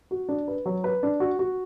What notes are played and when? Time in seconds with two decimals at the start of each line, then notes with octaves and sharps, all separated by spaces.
0.11 F#4
0.29 D4
0.48 B4
0.66 F#3
0.84 B4
1.03 D4
1.20 F#4
1.39 F#4